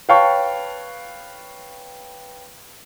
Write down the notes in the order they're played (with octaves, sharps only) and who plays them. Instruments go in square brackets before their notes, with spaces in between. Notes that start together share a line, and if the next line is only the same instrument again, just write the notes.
[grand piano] B4 C#5 F5 G5 A5 C#6